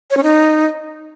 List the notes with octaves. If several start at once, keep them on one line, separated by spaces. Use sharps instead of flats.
C#5
C#4
D#4